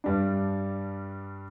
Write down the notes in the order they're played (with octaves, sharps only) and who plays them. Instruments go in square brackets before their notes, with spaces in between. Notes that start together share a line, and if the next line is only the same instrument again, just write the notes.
[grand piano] G2 G3 D4